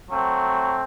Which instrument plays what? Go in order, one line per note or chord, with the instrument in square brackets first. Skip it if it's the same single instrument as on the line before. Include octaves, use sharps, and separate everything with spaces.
[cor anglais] F#3 [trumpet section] A3 C4